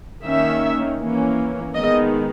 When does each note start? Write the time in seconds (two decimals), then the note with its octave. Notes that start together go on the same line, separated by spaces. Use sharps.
0.24 D#3 A#3 C#4 E5
0.99 E3 A#3 C#4
1.75 D#3 G#3 B3 D#5